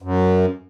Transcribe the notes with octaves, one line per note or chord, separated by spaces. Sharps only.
F#2